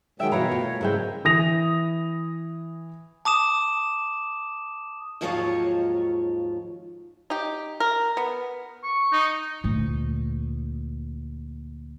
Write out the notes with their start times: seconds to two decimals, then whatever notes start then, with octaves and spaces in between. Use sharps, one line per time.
0.20 D#3 F#3 G#3 E5 G5
0.32 B2 E3 G3 C#5 F5 A#5 B5
0.51 A3 F4
0.81 G#2 C#3 F#3 G#3 E4 A#4 E5 G5
1.25 E3 D#6 A#6 F7
3.25 A5 D6 D#6 E7
5.21 D#2 G#2 F3 F#3 F4 C#5
7.30 D#4 G4
7.80 A#4
8.17 B3
8.83 C#6
9.13 D#4
9.64 D2 A#2